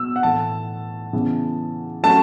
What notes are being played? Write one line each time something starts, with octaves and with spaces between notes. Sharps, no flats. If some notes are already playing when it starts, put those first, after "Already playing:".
Already playing: B2 E6
F#5
A2 E3 A3 A5
C#3 E3 B3
F#3 A3 C#4 A5